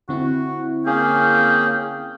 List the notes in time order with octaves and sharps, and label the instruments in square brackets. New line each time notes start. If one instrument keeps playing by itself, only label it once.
[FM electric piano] D3 C4 E4 [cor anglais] F#4
[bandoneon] A#3 C#4 G#4 [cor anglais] F5 [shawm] G5